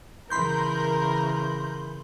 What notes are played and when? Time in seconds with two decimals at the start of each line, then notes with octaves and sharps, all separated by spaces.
0.30 C#3 E3 A#4 B5 C6 G6